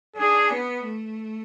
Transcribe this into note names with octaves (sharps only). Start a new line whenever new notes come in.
D4 G#4
B3
A3